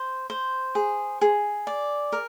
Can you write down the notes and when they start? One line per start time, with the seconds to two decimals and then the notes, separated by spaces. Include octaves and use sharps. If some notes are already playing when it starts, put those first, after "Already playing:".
Already playing: C5
0.30 C5
0.75 G#4
1.21 G#4
1.67 D5
2.12 A#4